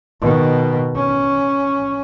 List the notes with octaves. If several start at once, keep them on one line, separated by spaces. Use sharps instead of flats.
B2 D#3
C#4